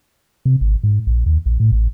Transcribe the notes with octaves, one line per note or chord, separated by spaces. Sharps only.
C3
G#1
G#2
A#1
D#2
A#1
A2
A1